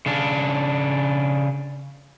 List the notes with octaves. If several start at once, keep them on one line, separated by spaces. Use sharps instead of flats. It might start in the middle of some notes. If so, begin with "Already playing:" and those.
C#3 D4